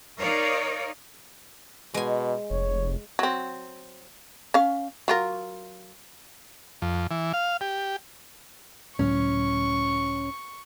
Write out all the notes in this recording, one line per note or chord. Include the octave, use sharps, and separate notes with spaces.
D#4 A#4 C#5 D5 F5
B2 G#3 G#5
F1 C#5
F#3 C4
C#4 F5
F#3 F4 A#4
F2
E3
F5
G4
C#2 A2 F#3 C#4 C#6